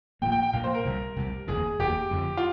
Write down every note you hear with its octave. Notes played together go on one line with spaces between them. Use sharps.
A#1 A#2 F3 A#3 G5
G5
G5
A#1 A#2 F3 A#3 F5
C5
A#4
C2 C3 G3
C2 C3 G3
F1 D#2 D#3 G#4
F1 D#2 D#3 G4
F2 D3 F3
F4